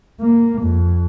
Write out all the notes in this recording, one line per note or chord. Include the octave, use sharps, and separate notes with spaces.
A#3
F2